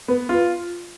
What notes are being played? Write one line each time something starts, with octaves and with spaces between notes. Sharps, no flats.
B3
F4